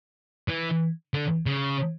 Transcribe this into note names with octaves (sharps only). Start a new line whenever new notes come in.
E3
D3
C#3